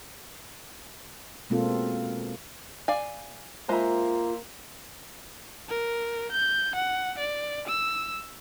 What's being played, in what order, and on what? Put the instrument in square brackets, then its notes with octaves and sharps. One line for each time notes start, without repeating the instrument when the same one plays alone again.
[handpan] B2 G#3 A#3 C4 F4 A4
[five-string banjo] D5 F5 G#5
[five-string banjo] G#3 [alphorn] A#3 [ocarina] F4 [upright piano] C5 E5 A#5
[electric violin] A#4
G6
F#5
D5
E6